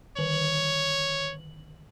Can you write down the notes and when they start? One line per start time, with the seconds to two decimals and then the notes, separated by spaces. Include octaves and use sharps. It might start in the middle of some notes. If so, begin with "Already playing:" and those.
0.17 D3 D#3 C#5 F#7